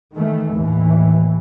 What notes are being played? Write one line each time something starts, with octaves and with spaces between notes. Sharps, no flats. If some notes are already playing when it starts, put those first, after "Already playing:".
D#3 E3 A3
D#2 A2 E3